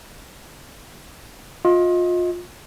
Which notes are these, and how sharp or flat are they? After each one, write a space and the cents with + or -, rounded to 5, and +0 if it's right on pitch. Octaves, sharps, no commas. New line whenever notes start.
F4 +30 D#5 +30